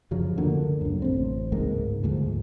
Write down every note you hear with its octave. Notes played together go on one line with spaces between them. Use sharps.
F#2 C#3 F3 F#3
D2 D3 A#3
C#2 F#2
A1 C4
C#2 G#2 G#3 A#3
D2 G#2 F3